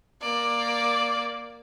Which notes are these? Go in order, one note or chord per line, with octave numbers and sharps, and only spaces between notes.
A#3 D5